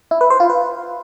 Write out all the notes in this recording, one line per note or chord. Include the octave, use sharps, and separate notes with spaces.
E4
B4
C5
F4
B4